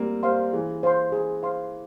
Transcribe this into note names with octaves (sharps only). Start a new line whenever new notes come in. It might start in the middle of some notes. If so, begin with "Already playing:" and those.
Already playing: G3 A#3 C4
G3 C5 F5 C6
E3 G#4
C5 F5 C6
G#4
C5 F5 C6